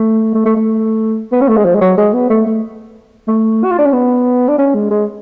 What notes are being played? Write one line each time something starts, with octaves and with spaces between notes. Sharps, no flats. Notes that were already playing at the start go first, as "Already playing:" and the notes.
Already playing: A3
A3
A3
A3
B3
C#4
A3
G#3
F3
G#3
F#3
G#3
B3
A3
A3
A3
F#4
F4
D4
C#4
B3
D4
C#4
G#3
G#3